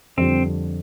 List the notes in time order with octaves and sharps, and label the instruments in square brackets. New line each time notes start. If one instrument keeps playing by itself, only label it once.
[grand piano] F2 D3 G3 D4 [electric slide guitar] C4